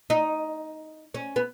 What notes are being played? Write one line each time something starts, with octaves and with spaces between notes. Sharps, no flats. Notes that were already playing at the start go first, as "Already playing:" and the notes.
D#4
C#4
B3